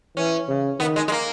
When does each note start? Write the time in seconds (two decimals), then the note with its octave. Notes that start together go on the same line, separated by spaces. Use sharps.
0.17 E3 C#4
0.49 C#3
0.80 D#3 B3
0.96 G#3
1.08 G#3
1.12 A#3